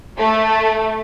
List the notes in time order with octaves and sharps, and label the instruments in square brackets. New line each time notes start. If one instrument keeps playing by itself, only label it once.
[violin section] A3